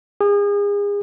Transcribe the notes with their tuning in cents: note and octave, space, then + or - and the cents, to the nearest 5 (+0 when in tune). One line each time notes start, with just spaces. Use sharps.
G#4 -35